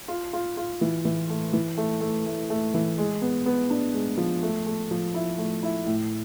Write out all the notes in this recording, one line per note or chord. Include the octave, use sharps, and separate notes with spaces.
F4
F4
F4
E3
E3
A3
E3
A3
A3
A3
A3
E3
G#3
B3
B3
D4
G#3
F3
A3
A3
F3
E4
A3
E4
A2